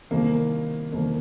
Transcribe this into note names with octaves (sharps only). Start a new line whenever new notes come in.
C2 C3 D#3 A#3
C2 C3 D#3 A#3